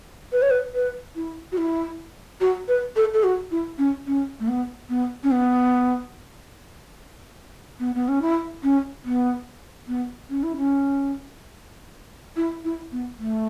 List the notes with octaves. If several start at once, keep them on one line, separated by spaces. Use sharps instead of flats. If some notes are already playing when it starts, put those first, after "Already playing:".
B4
C#5
B4
B4
E4
F#4
E4
F#4
B4
A4
A4
F#4
E4
C#4
C#4
A3
B3
B3
C#4
B3
B3
B3
C#4
E4
C#4
B3
B3
C#4
E4
C#4
E4
E4
B3
A3